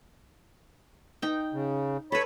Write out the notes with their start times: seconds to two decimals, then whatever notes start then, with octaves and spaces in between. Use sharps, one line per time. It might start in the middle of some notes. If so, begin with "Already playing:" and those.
1.22 D#4 G5
1.53 C#3
2.12 A4 B4 C#5 B5